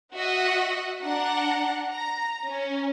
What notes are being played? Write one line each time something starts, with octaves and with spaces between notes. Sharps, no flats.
F#4 D#5 E5 F#5
D4 F#5 A#5
A#5
C#4